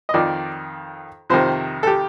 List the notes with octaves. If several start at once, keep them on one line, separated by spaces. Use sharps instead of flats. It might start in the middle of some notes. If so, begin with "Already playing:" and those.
D#5
F2 D#3 D5
F2 C3 D#3 C5
A4
G4